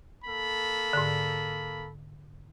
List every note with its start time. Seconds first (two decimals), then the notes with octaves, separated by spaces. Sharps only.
0.24 A#3 A4 B5
0.93 G#2 D3